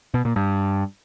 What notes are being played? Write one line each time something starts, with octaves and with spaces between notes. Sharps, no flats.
B2
A#2
G2